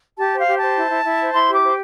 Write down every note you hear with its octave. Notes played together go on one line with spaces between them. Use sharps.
G4 A5
C5
F5
G4
C5 A5
E4
E4
E4
C5
E4 C6
G4
D6
C5